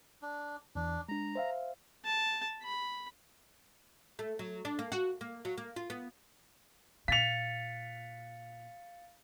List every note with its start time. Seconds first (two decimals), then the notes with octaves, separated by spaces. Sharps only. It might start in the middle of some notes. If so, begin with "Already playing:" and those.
0.22 D4
0.75 E2 E3 D4
1.09 G#3 D4 A#5
1.35 C5 E5 F5
2.05 A5
2.63 B5
4.19 A3
4.39 F#3
4.65 D4
4.79 A#3
4.92 F#4
5.21 A#3
5.45 F#3
5.58 A#3
5.76 F4
5.90 B3
7.08 A#2 F5 A6 B6 C#7 F7